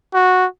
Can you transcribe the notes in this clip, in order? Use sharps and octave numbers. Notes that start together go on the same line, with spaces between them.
F#4